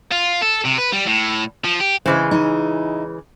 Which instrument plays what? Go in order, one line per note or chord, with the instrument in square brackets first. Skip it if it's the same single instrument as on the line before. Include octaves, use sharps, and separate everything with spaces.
[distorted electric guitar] F4
A4
C3
B4
G3
A2
F3
G4
[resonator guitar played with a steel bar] C#3 E3 G#3 [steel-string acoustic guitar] C5
[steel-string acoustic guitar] D#4 E4